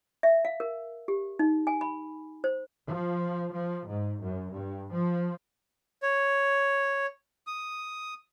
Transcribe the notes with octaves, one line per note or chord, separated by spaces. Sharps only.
E5
F5
A#4
G4
D#4
G#5
B5
C5
F3
F3
G#2
F#2
G2
F3
C#5
D#6